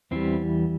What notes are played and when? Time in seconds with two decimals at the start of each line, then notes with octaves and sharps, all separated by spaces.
0.11 E2 E3 G3 C4